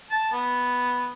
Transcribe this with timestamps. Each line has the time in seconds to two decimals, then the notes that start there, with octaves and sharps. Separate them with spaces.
0.10 A5
0.32 B3